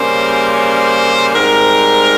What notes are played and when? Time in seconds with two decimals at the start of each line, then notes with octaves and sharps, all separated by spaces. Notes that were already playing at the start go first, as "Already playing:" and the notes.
Already playing: C#3 G3 A#3 C#4 C5
0.57 C5
1.35 G#2 G3 C4 A#4